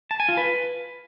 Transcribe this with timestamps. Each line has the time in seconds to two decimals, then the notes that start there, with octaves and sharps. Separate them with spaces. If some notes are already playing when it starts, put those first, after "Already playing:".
0.11 A5
0.20 G#5
0.29 F4
0.37 B4